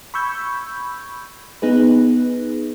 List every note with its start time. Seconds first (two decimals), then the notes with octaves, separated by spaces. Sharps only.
0.14 B5 C#6 E6 G6 G#6
1.62 B3 D#4 G#4 B4